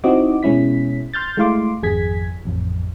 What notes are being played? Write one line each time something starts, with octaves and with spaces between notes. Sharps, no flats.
C4 D#4 E4 F#4 D#5 D6
B2 G#3 C#4 E4 B6
C6 F6 G6 A6
G#3 A3 E4 F5 C6 D6
G#1 F2 G#4 G#6 B6
A1 F2